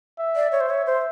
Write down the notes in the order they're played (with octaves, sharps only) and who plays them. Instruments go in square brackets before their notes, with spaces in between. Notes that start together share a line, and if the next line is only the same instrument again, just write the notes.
[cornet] E5
[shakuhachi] D5
C#5
C5
[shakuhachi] C#5 [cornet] E5
[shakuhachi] C5